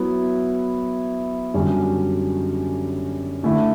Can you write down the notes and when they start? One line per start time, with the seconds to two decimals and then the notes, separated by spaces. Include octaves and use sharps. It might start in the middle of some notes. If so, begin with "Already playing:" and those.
Already playing: F#3 B3 E4
1.54 F#2 D3 G3 C#4 G4
3.44 D3 A3 E4 A4 E5